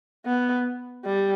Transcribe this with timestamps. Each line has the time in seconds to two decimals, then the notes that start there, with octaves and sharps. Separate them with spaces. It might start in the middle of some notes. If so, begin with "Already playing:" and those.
0.26 B3
1.05 G3